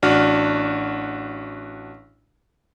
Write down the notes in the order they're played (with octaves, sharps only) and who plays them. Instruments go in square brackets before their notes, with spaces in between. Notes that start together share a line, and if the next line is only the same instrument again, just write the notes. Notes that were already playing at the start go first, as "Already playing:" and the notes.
[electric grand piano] A1 D4 F#4 F6